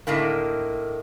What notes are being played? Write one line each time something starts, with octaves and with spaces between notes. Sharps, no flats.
A2 D3 D#3 A#3